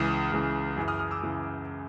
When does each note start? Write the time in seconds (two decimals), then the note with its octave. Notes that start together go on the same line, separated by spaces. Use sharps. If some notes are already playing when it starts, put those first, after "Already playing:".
Already playing: C#2 C#3 E3 D#6 F6
0.32 C#2 C#3 E3
0.77 F#2 C#3 E3
0.88 D#6 F6
0.99 D#6 F6
1.11 D6 E6
1.23 C#3 E3